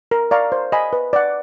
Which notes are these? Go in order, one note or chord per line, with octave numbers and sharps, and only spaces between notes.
A#4
D5 F5 A#5 C#6
C5
D#5 G#5 B5
B4
D5 F#5